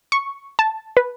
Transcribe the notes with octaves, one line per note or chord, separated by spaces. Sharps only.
C#6
A5
B4